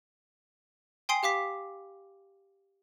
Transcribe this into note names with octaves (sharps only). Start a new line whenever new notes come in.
G5 G#5 C6 D#6 C7 D7
G4 F5 D6 B6